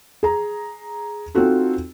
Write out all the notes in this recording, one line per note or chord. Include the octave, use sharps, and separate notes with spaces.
G#4 A#5
C4 D#4 F4 F#4 A4